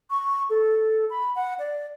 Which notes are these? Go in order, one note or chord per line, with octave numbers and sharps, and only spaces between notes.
C#6
A4
B5
F#5
D5